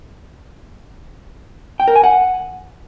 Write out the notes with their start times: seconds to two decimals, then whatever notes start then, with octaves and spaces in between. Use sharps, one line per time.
1.80 G5
1.88 A#4
1.96 G#5
2.04 F#5